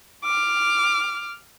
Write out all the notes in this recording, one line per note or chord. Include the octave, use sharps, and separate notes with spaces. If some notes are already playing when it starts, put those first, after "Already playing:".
D6 F6